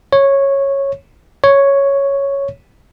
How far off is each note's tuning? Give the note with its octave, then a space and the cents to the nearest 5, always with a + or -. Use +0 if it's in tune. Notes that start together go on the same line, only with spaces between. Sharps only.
C#5 -10
C#5 +0